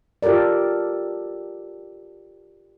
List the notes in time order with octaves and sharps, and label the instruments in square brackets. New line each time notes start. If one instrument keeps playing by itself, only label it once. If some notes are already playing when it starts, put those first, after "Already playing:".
[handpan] F4 G4 A4 A#4 D5